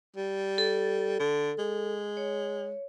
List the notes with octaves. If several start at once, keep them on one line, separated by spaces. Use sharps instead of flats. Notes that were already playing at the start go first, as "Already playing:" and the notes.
G3
A4
D3
G#3
C#5